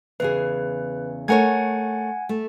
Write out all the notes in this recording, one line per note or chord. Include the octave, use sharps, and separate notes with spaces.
E2 C#3 G#4 B4
A3 A#4 C#5 F#5 G#5 G#6
A3